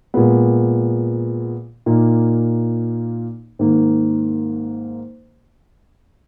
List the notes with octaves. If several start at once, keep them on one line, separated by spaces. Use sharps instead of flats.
A#2 G#3 B3
A#2 A#3 D#4
G#2 D#3 A#3